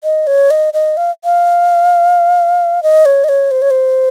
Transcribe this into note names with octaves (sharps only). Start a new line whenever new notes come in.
D#5
C#5
D#5
D#5
F5
F5
D#5
C#5
D#5
C#5
C5
C#5
C5